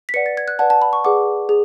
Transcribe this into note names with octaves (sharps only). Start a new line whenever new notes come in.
B6
B4 D5 F#5 C#7
A6
G#6
F#6
B4 D5 F#5 A5
A5
B5
C#6
G#4 B4 D5 F#5 D6
G#4